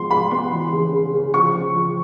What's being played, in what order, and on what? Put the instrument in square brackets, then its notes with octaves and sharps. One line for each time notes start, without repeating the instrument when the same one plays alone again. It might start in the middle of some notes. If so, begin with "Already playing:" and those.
Already playing: [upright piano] F3 G#3 B3 C6
G#3 B5
B3 C6
E3
C#3
C#3
C#3
F3 C#6
C#3
F3